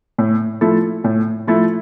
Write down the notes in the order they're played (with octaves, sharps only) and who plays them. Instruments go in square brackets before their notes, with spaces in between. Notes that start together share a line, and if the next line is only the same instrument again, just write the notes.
[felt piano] A2
F3 A3 E4 A4
A2
F3 A3 E4 A4